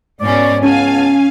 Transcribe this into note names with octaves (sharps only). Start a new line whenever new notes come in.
G#2 B2 C#4 D5
C#2 B3 C#4 F5 G#5 A5